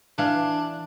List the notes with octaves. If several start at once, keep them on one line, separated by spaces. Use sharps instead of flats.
E3 D4 F5